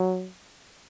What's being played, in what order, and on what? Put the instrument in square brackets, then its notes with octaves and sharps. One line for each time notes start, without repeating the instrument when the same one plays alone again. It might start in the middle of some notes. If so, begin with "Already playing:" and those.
Already playing: [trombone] F#3